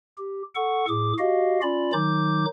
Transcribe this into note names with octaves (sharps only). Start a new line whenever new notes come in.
G4
A4 F#5 C#6
A2 G#4 D6
F#4 G4 D#5 F5
C#4 F4 D5 B5
D#3 F#3 D#4 D6 G6